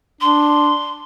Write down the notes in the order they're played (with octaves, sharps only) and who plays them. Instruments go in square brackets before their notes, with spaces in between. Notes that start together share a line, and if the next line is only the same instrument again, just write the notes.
[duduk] D4 [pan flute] C6